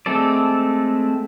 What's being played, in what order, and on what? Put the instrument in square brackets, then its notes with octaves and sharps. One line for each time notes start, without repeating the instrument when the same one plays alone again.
[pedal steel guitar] G#3 A3 C4 A4 D5